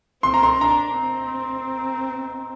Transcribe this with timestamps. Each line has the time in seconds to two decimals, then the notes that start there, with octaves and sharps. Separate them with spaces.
0.23 C4 C6
0.34 A#5
0.43 C6
0.61 D4 A#5
0.98 C4